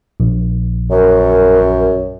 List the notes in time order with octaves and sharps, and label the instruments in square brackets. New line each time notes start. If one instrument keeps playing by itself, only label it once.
[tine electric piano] A#1
[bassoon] F#2 [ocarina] A#4